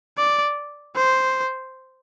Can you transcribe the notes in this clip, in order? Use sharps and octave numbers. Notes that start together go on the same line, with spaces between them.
D5
C5